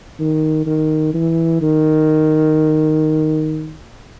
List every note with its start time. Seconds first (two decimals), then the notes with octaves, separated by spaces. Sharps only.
0.20 D#3
0.66 D#3
1.14 E3
1.61 D#3